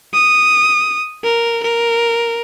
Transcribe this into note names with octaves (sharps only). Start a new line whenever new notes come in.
D#6
A#4
A#4